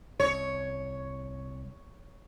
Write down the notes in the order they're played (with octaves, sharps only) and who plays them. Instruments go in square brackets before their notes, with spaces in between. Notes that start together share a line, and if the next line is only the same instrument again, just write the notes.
[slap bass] C2 [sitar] C#5